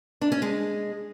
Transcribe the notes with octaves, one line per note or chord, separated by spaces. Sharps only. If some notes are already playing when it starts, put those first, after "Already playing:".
D4
C#4
G#3